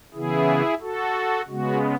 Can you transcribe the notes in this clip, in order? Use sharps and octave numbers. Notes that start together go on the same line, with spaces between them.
C#3 E3 B3 E4 G#4
F#4 A4
C#3 G#3 B3 F#4